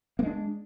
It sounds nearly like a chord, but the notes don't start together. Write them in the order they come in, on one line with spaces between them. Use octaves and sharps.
A#3 G#3 D4